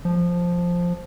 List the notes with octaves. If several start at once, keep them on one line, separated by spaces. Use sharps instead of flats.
F3